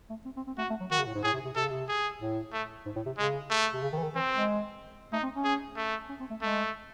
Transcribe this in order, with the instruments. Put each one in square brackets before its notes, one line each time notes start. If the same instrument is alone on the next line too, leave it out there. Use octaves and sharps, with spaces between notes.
[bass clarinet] A3
C4
C4
C4
[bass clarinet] A3 [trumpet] F#4
[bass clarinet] A3
F#3
[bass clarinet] D#3 [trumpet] F#4
[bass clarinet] C#3
A2
G#2
[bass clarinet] A2 [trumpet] G#4
[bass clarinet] C3
C3
[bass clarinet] C3 [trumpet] A4
[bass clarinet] C#3
C3
[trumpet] G#4
[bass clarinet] A2
[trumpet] A3
[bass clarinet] G#2
A2
C3
[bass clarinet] C#3 [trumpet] G#3
[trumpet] A3
[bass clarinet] C3
C#3
D#3
E3
D#3
[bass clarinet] E3 [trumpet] C4
[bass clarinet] G#3
[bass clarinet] A3 [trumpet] D#4
[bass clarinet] C4
C#4
[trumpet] G#4
A3
[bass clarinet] C#4
C4
A3
[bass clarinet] G#3 [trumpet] A3